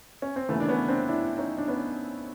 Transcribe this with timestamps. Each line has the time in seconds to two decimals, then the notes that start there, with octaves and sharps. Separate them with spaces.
0.22 C#4
0.36 C4
0.49 D#2 C#3 E3 A3 B3
0.60 D4
0.68 B3 C#4
0.88 C4 D4
1.08 D4 E4
1.38 C#4 D#4
1.58 D4
1.68 B3 C#4